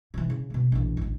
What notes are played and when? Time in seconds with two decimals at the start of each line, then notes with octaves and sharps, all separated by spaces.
0.14 C3 E3
0.30 C#3
0.50 B2 A#3
0.72 A#1 E3
0.97 A1 D2